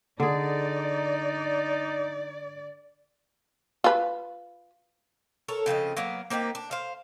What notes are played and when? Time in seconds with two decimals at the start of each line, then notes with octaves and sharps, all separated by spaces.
0.20 D3 D#4 G#4 D5
3.84 F4 B4
5.48 A4 A#4 C#5
5.66 C#3 F3 C4 D#5
5.97 F#3 A#3 B3 A#4
6.30 A#3 C4 D#4 G4
6.55 D4
6.71 C5 F5